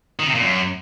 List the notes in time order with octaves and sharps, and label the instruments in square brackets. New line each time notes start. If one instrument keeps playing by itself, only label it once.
[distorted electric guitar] D#3
C3
A#2
F#2